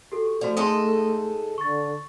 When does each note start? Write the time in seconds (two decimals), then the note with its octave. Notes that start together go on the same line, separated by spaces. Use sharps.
0.12 F#4 G4 A4
0.41 F3 A3 F#4 D5
0.57 G#2 A4 D#5 C6 D#6
1.58 D3 C#6 A6